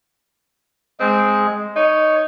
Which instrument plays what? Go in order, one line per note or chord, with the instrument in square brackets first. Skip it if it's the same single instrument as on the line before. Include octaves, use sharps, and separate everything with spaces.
[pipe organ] G#3 G#4 [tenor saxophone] C4
[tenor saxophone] D#4 [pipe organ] C#5